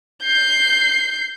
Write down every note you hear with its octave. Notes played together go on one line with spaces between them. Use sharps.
G6 C7